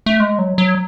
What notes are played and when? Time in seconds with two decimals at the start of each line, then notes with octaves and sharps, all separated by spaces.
0.06 A3
0.20 G#3
0.39 F#3
0.58 F#3